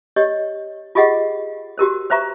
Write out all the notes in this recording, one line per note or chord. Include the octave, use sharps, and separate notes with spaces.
G4 C#5 D#5
F4 G4 G#4 D#5 F5 F#5
F#4 G4 A#4 C5
B4 C5 E5 A#5 C#6